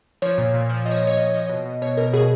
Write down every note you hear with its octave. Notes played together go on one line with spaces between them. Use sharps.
F3 C#5
A#2
A#2
F3
F3 D#5
C#5
D#5
A#2
C#5
A#2 D#5
F3 D#5
B2
B2
B2 C#5
B2 A#4
B2 G#4